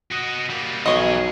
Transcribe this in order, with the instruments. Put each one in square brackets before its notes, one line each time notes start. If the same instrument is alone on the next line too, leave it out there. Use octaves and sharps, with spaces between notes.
[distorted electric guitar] F#4 D#5
G3 A#3
[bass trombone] B1 [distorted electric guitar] E3 G#4 [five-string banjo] C#5 D#5